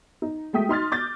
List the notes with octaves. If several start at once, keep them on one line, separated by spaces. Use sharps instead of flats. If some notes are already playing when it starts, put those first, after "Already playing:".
D#4
G#3 A3 G5 D#6 B6
D#4 C6 F6 A6
D6 G6 A6